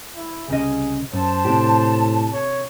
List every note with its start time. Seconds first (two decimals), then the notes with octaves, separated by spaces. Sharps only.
0.16 E4
0.48 C2 C#3 G#4 D#5
1.13 F#2 C5 A5
1.45 A2 C3 D4 G4
2.32 C#5